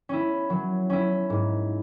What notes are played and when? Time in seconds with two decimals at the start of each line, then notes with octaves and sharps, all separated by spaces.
0.09 C#4 E4
0.50 F#3
0.90 C#4 E4
1.30 G#2